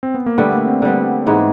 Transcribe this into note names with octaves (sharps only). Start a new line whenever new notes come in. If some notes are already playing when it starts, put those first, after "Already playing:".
C4
B3
A#3
D3 G3 A3 B3
A#3
C4
D3 G3 B3
G#2 E3 G#3 B3